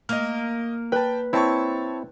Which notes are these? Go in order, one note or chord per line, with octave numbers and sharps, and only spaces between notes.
A#3 D#5 F6
B4 G5 A5
C4 E4 C#5 A5 C#6